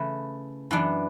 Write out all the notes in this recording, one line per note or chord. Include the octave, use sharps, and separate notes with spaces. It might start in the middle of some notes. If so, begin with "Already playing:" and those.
Already playing: C#3 E3 A3 E4
F#2 E3 B3 D4